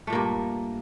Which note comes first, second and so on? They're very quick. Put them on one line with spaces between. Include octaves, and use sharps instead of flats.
A3 A#2 A#3 G2